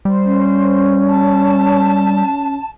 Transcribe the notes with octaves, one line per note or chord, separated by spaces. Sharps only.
G3 C5
C#4
A5